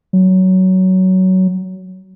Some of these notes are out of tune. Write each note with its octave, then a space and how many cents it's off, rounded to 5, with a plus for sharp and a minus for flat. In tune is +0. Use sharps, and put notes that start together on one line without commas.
F#3 +15